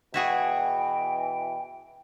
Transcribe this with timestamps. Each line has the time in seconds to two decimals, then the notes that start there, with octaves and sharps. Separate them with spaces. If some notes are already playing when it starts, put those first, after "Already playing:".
0.14 B2 E3 E4 F#4 G#4 G5